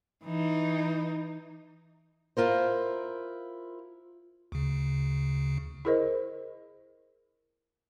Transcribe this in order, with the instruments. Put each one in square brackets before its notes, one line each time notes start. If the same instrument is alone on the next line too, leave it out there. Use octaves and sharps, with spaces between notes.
[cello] E3 D#4
[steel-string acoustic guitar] E4 F4 A#4 C5
[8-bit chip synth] D2 C#3
[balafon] E4 G#4 A#4 C5 D#5